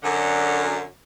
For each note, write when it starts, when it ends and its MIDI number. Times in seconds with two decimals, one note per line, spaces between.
0.03 0.85 42
0.03 0.85 50